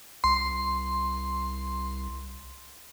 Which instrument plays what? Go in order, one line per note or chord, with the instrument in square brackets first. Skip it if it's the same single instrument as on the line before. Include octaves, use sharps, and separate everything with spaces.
[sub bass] C2 [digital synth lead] C6